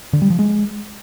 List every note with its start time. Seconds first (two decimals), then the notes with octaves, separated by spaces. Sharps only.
0.13 D3
0.22 G3
0.30 F3
0.39 G#3